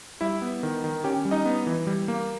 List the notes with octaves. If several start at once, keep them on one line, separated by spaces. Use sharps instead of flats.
G3 E4 E5
B3
D#3
D#3
C#4 G4 G5
G3
D#4 D#5
B3
E3
G3
A#3